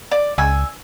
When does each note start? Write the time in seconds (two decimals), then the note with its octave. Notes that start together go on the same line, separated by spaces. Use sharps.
0.11 D5
0.38 C#2 G#5 E6